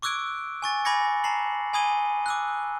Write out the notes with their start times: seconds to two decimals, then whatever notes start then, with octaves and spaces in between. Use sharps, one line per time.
0.02 C#6 D6 E6 F#6 G#6 D7
0.62 G#5 C#6 A6
0.85 G#5 B5 D6 G#6 A#6 C#7
1.24 A5 A#5 C7 F#7
1.73 G#5 B5 D#6 G#6 D#7 G7
2.26 D6 E6 F#6